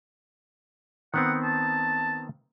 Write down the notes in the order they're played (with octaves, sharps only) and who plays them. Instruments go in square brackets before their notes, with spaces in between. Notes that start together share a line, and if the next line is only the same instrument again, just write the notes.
[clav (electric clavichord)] D#3 B3 C4 [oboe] F#5
[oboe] A5